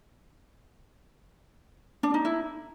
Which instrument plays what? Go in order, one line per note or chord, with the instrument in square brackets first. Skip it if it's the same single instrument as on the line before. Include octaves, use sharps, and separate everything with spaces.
[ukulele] D4
D#4
E4